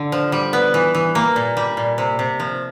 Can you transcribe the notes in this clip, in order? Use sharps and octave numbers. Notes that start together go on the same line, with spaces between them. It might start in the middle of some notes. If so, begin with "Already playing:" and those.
Already playing: D3
F3
G3
B3
E3
E3
A#3
A#2
G3
A#2
C3
C3
F3